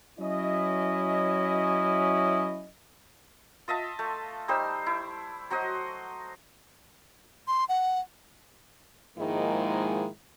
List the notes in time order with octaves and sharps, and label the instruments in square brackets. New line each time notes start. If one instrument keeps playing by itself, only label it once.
[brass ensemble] F#3 C#4 E4 D#5
[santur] F4 D#5 E5 A5
A3
G3 D#4 C5 E6
E4
F#3 F#4 C5 D#5
[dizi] C6
F#5
[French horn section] G#2 D#3 F3 G#3 A#3 E4